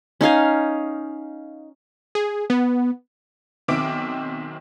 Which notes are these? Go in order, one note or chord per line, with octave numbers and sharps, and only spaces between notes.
C#4 D#4 F5 G#5
G#4
B3
B1 D#3 C4 E5 D6 D7